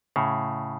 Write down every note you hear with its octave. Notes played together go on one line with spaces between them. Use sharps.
A2 C#3